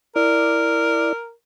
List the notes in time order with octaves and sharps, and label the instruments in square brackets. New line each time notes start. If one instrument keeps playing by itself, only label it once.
[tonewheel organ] E4 D5 [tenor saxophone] A#4